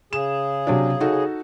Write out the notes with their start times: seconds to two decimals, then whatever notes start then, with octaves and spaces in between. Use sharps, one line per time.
0.13 C#3 G#4 E7
0.67 C3 F#3 D4
1.00 D#4 F#4 A4